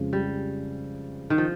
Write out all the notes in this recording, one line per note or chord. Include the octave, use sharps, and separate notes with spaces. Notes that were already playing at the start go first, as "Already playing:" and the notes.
Already playing: F2 C#3 G#3
G3
D#3
F3